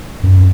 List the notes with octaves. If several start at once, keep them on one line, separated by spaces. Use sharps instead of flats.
F#2